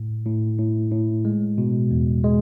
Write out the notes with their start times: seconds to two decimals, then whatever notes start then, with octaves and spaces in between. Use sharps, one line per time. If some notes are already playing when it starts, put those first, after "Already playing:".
Already playing: A2
0.26 A2
0.59 A2
0.92 A2
1.25 G#3
1.58 B2
1.91 E2
2.24 G#3